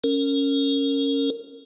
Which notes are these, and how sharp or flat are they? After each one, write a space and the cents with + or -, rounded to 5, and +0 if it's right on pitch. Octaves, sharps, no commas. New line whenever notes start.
C#4 +0 A#4 -20